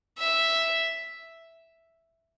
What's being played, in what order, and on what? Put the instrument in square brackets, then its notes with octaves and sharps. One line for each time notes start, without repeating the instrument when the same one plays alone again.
[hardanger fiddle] E5